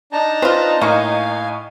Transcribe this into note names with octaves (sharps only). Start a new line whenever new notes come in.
D4 D#4 A5 A#5
C4 F4 B4
A2 A#3 F5 G#5 C#6 C#7